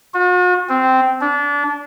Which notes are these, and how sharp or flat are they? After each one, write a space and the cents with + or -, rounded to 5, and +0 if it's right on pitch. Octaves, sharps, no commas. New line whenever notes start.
F#4 -45
C4 -10
D4 -25